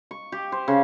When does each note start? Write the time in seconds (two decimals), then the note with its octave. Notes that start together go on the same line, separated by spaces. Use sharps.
0.11 C#6
0.32 G4
0.52 C5
0.68 C#3